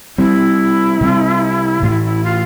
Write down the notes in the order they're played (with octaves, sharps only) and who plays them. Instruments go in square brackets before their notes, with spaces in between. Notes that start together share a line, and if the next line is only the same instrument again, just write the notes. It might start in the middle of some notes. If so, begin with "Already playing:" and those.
[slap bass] C3 G3 C4 [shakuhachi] E4
[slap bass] C3 G3 C4
[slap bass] A2 E3 A3 [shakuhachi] F4
[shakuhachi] E4
E4
F4